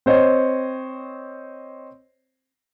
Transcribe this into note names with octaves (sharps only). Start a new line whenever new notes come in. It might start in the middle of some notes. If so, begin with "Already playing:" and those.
C4 C5 C#5 D#5